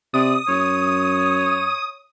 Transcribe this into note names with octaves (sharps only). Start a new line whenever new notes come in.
C3 D5 D#6
F#2 C#5